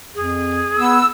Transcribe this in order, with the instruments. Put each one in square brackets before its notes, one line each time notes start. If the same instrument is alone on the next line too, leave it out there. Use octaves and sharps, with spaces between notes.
[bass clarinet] F2 [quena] G#4
[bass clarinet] B3 [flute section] E6